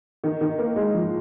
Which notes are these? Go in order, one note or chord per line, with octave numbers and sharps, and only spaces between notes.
D#3
D#3
A#3
G#3
F3